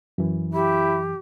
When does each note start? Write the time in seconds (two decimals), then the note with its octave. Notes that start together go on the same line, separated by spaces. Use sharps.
0.18 F#2 E3
0.53 E4 G4